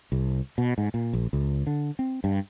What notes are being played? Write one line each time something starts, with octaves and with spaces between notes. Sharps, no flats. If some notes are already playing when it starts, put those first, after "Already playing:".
C2
B2
G#2
A#2
A#1
C#2
D3
C4
G2